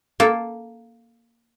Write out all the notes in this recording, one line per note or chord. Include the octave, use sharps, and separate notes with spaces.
A#3 A4